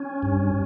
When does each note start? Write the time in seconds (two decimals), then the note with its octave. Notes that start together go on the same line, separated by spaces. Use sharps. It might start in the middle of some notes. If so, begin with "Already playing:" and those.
Already playing: C#4
0.23 G2